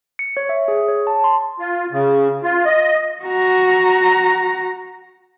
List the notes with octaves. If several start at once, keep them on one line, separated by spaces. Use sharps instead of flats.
C#7
C#5
E5
G#4
C#5
A5
C6
F4
C#3
F4
D#5
F#4 A#5